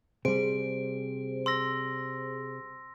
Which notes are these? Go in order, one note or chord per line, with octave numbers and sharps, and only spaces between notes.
C3 G3 G#4 C5 D7
C6 E6 A#6